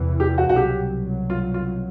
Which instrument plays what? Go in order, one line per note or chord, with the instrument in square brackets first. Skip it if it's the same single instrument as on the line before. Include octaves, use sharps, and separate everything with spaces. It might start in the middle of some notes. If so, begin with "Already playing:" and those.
Already playing: [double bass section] E2 C3 E3
[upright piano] G4
F#4
F#4
[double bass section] C2 B2 F#3 [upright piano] G4
[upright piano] F4
F4